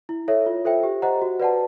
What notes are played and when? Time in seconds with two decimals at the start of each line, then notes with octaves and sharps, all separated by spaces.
0.09 E4
0.28 A4 C#5 E5
0.46 F4
0.65 A4 C5 E5 G5
0.83 G4
1.02 C5 D#5 F#5 A#5
1.22 F#4
1.40 B4 D5 F#5 A5